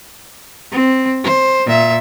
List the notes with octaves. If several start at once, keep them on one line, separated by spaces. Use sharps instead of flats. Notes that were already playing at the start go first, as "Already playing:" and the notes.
C4
C5
A#2 E5